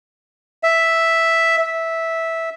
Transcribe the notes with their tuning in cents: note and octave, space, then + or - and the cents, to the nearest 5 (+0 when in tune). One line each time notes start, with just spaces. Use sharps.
E5 +0
E5 -10